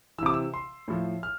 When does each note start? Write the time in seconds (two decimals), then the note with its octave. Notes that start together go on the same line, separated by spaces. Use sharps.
0.18 E3 E6
0.23 C3 D6
0.34 E6
0.54 C6
0.88 A2 F3
1.23 F6